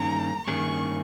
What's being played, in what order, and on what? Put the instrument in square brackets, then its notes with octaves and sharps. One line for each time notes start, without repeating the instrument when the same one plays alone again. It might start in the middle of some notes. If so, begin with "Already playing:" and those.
Already playing: [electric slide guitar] G2 D#3 A#3 C#4 G#4 [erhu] A#5
[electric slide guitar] G2 D#3 A#3 C#4 G#4 [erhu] C#6